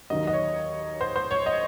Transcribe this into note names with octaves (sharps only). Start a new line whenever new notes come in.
D#2 D#3 F#3 D#5
D#5
C#5
C5
C5
C#5
D#5